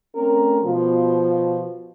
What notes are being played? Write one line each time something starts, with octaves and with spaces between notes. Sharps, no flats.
A3 C4 C#4 A#4
B2 F3